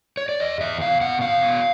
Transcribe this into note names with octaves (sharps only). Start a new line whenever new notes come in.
C#5
D5
E2 D#5
E2 E5
B2 F5
B2 F#5
E2 F5
B2